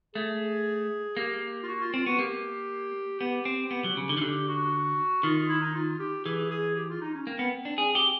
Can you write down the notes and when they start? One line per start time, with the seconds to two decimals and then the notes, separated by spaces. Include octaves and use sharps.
0.15 A3 G#4
1.17 A#3 G4
1.63 F4
1.68 F#4
1.81 F4
1.94 C4 F4
2.06 B3 F#4
2.19 A#3 G4
3.20 B3 G4
3.45 C4
3.71 B3
3.84 F#3
3.97 C#3
4.09 D3
4.17 D#3
4.21 D3 G4
4.48 F#4
5.23 D#3 F4
5.36 F4
5.49 E4
5.61 D#4
5.75 F4
5.99 G4
6.25 E3 G#4
6.50 G#4
6.76 G4
6.89 F4
7.01 D#4
7.14 C#4
7.27 A#3 C4
7.39 B3
7.65 D4
7.78 G#4
7.95 G4